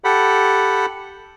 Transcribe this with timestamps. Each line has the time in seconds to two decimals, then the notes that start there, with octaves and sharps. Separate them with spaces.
0.04 G4 A4 F#5 B5